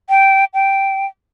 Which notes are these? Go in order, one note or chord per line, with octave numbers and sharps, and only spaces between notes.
G5
G5